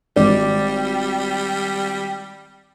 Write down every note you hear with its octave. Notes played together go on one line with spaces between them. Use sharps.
G#1 G3 D5